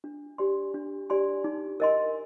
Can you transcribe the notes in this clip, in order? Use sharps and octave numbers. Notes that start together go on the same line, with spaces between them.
D4
G4 D5 G#5 C6
D4
G4 D5 G#5 C6
D#4
A#4 D#5 G#5 C6